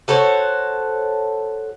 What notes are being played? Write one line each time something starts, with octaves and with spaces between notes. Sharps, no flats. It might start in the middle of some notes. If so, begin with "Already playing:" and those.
F#4 A4 C5 C#5